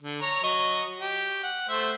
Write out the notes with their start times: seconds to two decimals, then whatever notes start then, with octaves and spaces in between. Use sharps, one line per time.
0.03 D3
0.22 C#5 A#5
0.43 F#3 D#5 C#6
1.00 G4
1.43 F#5
1.69 A3 C5 E5